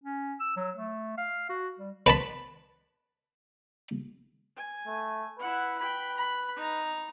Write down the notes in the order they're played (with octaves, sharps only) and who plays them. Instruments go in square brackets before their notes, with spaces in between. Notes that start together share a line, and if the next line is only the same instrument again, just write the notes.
[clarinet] C#4
E6
F#3
A3
F5
F#4
G3
[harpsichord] B4 A5 B5
[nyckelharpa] G#5
[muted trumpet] A3
[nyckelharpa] E4 F#5 [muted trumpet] B4
[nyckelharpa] G5 B5
B5
D#4 A#5